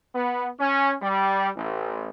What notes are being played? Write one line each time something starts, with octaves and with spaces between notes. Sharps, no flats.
B3
C#4
G3
A1